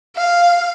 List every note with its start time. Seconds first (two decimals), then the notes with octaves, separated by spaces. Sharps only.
0.16 F5